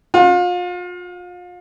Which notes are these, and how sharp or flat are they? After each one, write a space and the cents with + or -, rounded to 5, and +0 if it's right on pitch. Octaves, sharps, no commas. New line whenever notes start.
F4 +35 F#5 +0